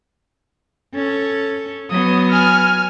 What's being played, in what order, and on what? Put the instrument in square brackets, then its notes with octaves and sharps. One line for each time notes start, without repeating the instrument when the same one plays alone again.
[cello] C#4 A4
[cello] F#3 B3 [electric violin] D#6
[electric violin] G#5 F6